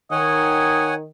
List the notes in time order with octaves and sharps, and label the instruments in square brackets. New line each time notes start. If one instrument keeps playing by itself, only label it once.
[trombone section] D#3 [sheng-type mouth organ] C#5 F#5 G#5 [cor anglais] D#5